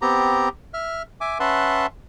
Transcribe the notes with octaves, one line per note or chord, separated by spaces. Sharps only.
B3 C4 G4 A#5
E5 F6
E5 G#5 D6
C#4 B4 E5 F#5 A5 C6